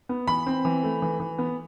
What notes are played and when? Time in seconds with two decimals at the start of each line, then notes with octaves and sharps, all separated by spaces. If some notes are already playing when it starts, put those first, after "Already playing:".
0.09 B3
0.27 E3 B5
0.47 C4
0.65 E3
0.83 A3
1.02 E3
1.20 E3
1.38 B3